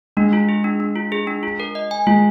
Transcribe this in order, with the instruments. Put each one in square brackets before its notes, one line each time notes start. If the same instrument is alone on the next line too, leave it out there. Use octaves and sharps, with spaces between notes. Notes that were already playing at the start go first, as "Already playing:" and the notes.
[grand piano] G#3 [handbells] D4
[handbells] F4
G#4
D4
D4
F4
G#4
D4
F4
A#4
D#5
G#5
[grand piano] G#3 [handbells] F4